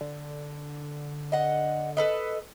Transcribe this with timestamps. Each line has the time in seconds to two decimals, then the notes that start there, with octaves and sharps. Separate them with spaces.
0.01 D3
1.32 D#5 F#5
1.97 A4 B4 D#5